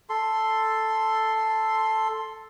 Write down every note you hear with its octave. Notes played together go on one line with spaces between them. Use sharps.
A4 C6